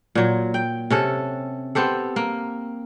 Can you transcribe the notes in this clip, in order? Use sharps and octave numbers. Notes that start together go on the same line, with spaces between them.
A#2 F#3
G5
C3 C#4 A4
B3 C4 G4 A4
A#3